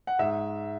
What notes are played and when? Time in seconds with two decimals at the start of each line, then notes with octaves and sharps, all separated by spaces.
0.07 F#5
0.19 G#2 E5